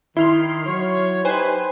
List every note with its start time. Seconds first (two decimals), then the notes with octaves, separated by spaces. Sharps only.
0.17 D#3 E4 C6 F6 C7
0.66 F#3 C#5
1.25 D#4 G4 B4 C5 G#5